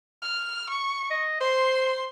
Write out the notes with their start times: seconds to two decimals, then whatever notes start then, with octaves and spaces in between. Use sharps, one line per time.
0.22 F6
0.70 C#6
1.11 D#5
1.41 C5 C6